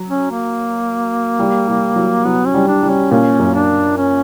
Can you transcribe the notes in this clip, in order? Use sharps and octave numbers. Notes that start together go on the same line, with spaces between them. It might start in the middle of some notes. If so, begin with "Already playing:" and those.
Already playing: F#3
C#4
A#3
G3
G3
F#3
F#3 B3
C#4
G3
D4
G3
C#4
A#2 C#4
F#2
D4
C#4